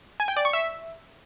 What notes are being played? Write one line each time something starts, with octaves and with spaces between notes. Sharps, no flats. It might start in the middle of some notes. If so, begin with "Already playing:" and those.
G#5
G5
D5
C#6
E5